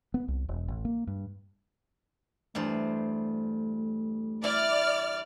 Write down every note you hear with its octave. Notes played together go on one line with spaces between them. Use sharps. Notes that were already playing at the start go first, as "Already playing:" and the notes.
B3
C2
E1
A1
A#3
G2
E2 G2 A3 C5
E4 D5 F6